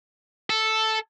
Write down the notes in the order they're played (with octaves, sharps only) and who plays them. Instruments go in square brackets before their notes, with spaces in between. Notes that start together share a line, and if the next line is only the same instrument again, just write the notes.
[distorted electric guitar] A4